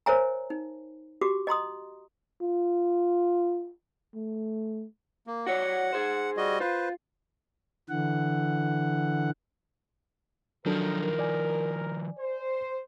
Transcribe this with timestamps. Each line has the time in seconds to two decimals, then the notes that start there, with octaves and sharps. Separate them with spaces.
0.06 A#4 C5 C#5 E5 G#5 A#5
0.50 D#4
1.21 F#4 G4 D6
1.47 D#5 A#5 C6 D#6
2.42 F4
4.15 A3
5.27 A#3
5.47 F#4 C#5 D5 F#5
5.93 G#4 C5
6.37 G3 F#4 D#5
6.60 F4 B4 C5
7.89 D3 E3 F#5
10.66 D#3 F3 F#3 D4 A4 A#4
11.19 D5 G#5
12.18 C5